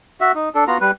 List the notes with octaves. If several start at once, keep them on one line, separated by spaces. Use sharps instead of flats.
F#4 E5
D#4
D4 A4
B3 F4 F#4 A#5
G3 B4